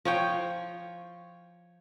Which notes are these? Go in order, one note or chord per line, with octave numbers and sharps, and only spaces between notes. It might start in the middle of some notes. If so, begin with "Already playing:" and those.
F3 C#5 G5